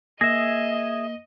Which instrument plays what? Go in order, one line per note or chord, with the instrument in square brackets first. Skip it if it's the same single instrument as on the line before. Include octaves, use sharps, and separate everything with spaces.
[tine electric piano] A#3 [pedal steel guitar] G#4 E5 [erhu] D#5 [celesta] A#6